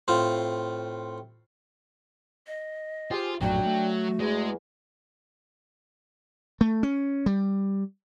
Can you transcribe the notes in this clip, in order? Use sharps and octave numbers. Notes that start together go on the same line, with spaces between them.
A2 C4 F4
D#5
F4 G4 G#4 C5
A#1 F#2 A2 F#3 D4 F#4 G5
A3
E2 G#3
A3
C#4
G3